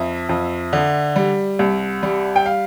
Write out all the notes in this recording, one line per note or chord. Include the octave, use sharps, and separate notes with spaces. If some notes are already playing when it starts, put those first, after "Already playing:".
Already playing: F2 E5
F2
D3
G3
C2
G3
G5
F5